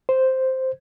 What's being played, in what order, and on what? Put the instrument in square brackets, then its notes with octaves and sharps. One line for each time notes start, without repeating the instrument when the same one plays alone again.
[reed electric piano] C5